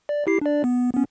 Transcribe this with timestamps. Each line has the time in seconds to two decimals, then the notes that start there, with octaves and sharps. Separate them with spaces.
0.09 D5
0.27 E4 G4 C7
0.41 D4 D5
0.64 B3
0.93 B3 C#4